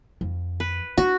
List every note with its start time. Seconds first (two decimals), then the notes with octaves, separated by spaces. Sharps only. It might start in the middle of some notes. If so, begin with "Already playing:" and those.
0.21 F2
0.60 B4
0.98 D4 F#4